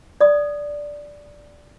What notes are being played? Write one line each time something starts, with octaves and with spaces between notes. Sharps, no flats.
D5 D#6